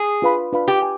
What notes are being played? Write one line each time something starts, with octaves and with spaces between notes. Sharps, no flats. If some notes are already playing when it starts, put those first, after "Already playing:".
Already playing: G#4
D4 F4 B4 F5 B5
D4 F4 B4 F5 B5
G4
G#5